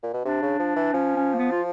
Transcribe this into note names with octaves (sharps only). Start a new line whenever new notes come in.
A#2
B2
C3 D4
C#3
F3
E3
F3 C#4
C#4
A#3
B3
F4